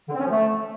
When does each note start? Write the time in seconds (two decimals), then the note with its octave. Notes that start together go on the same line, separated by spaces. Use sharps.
0.09 D3
0.14 C4
0.19 C#4
0.25 F3
0.30 A3